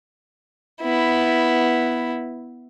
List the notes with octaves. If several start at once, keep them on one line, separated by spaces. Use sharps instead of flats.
B3 E4